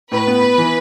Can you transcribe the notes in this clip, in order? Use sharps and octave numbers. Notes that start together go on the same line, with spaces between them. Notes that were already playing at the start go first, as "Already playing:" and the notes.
A2 B4
B3
B3
E3